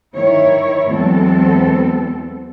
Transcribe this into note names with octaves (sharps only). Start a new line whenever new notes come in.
D#3 E4 C#5
E2 F#3 G#3 B3 C4 A4